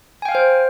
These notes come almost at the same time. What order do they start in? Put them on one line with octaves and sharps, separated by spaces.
G#5 G5 F5 F6 C5